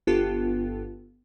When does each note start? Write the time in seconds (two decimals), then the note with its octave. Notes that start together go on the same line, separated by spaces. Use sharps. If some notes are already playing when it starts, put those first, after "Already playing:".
0.07 G1 B3 F4 G4 A4 A5